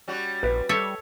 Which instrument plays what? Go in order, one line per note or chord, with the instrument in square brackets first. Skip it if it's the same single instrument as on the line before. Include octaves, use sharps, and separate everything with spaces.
[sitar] G3 C#4 F#4
[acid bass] A#1 [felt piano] B4
[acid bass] G3 [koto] A4 C#5 E5